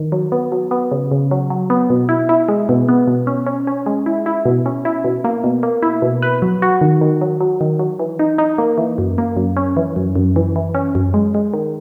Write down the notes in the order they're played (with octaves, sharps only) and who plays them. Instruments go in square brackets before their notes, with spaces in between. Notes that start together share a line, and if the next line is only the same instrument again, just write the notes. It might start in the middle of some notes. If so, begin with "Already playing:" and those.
Already playing: [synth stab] D#3
F#3
B3
F#3
B3
C#3
C#3
F#3
F#3
B3
B2
E4
E4
G#3
B2
B3
B2
C#4
C#4
C#4
G#3
E4
E4
B2
C#4
E4
B2
A#3
B2
A#3
E4
B2
B4
F#3
F#4
D#3
D#3
F#3
F#3
D#3
F#3
E3
D#4
D#4
A#3
E3
F#2
A#3
F#2
C#4
E3
F#2
F#2
E3
E3
C#4
F#2
G#3
G#3
D#3